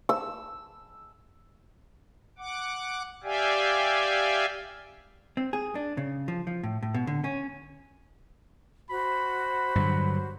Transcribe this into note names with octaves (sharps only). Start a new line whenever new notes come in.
E6
F#5 D6
G4 D5 E5 F5 G5 G#5
C4
G#4
D4
C#3
F3
F3
A2
A2
B2
D3
C#4
F#4 C5 B5
G2 D3 F#3